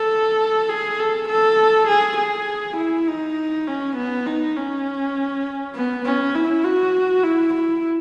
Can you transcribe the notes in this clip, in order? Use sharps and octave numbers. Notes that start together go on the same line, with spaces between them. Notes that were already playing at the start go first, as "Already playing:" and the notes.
Already playing: A4
G#4
A4
A4
G#4
G#4
E4
D#4
C#4
B3
D#4
C#4
B3
C#4
E4
F#4
E4
E4